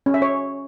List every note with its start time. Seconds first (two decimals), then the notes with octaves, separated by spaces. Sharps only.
0.06 C#4
0.14 E5
0.22 C#5